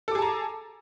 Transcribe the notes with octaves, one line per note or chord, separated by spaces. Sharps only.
G#4 A4 A5 A#5 D6